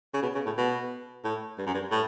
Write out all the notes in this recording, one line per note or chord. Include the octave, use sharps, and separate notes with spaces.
C#3
B2
C#3
A2
B2
A2
G2
F#2
G2
A2